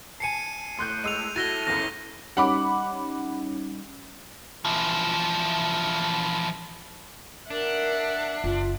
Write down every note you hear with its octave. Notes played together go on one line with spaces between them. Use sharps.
G#5 A5 C7 C#7 D#7
A2 C6 F#6 G6
G#3 E6 D#7 F7
E4 F#4 A4 A6 A#6 D#7 G7
G1 C#2 F#2 A#6
G3 C#4 D#4 F#5 B5 D6
E3 F3
D4 A#4 E5 F#5
F#1 F4